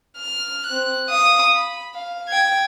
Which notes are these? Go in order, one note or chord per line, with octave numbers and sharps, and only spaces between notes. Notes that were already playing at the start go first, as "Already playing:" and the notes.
F6
C4 F#6
F5 D#6
B5
F5
G5 G#6